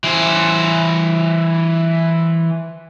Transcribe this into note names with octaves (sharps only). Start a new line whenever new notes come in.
E3 C5